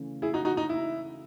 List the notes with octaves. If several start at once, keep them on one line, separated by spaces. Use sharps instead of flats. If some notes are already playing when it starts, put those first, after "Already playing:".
Already playing: C#3 E3 A3 C#4
E4 G#4
D#4 F#4
D#4 F#4
D#4
E4